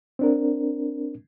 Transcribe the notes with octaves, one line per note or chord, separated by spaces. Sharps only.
C4 D4 A#4